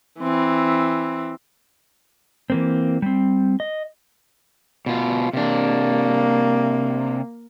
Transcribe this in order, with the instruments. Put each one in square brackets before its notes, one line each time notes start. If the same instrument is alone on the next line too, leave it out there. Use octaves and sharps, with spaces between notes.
[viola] E3 C4
[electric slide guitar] E3 A#3 C4
G3 C4
D#5
B2 F4
[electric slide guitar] C3 D4 [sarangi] A#3